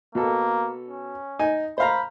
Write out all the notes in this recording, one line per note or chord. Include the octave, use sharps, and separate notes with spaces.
B2 A#3 A4
C#4
D#4 G#5
C5 F5 A#5 B5